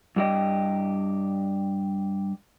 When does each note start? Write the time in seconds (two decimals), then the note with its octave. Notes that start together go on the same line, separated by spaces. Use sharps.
0.16 G2 G4 D#5